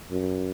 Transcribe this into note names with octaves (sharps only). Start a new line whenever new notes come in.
F#2